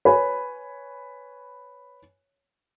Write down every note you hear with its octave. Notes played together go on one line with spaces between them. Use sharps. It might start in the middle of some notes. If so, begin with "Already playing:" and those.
B4 C#5 G#5 B5